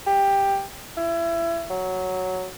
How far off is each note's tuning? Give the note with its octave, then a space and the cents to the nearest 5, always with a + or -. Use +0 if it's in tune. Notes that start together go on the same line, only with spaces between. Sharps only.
G4 +10
E4 +30
F#3 +0